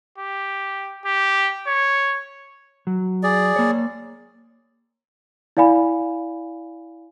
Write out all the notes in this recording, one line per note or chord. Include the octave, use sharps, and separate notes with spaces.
G4
G4
C#5
F#3
G#4 D5
A#3 C#5
E4 D5 F5 G#5 B5